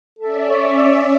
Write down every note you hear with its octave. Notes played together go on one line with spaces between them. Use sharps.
C#4 A4 D5 E5
C#5